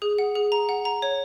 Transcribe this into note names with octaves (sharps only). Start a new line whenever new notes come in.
G#4
F#5
G#4
A#5
F#5
A#5
C#5